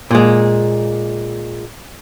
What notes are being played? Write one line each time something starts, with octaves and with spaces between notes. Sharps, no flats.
A#2 G#3